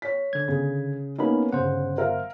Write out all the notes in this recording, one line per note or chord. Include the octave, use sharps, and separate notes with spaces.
C#5 B6
D3 G#6
C#3 G#4
A#3 B3 C#4 D#4 B5
G1 C#3 C5 F#5
A#4 E5 F5